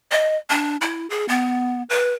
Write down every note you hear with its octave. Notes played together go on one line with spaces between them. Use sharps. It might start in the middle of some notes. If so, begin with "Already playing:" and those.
D#5
D4
E4
G#4
B3
B4